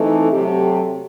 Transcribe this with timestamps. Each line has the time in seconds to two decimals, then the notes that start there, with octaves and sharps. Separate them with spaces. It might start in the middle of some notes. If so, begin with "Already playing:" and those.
Already playing: E3 A3 C4 D#4 A4
0.32 C3 F#3 A3 G4